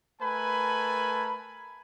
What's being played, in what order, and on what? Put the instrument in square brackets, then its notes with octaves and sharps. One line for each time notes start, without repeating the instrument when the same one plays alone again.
[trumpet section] A3 A#4 B4 G#5 A5 B5